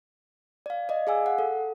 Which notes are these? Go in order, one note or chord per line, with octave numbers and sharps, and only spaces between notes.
D5 F5
D5 D#5
G#4 F5 G#5 E6
F#5
A4